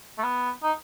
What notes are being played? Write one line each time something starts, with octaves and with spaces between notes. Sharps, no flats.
A3
B3
D#4